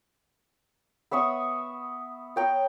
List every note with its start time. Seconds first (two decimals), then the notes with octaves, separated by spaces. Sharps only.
1.11 B3 E5 C#6 D#6
2.36 C#5 G5 A#5